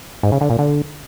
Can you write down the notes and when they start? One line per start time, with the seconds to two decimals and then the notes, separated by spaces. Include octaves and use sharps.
0.23 G#2
0.32 C#3
0.41 D3
0.50 A#2
0.59 D3